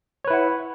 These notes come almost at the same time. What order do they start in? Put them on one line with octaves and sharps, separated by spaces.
C#5 B4 E4 F#5